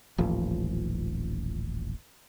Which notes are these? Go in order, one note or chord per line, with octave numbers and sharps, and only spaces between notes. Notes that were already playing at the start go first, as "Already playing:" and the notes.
D#1 A1 F3